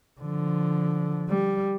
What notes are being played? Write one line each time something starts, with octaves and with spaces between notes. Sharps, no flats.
D3 F3
G3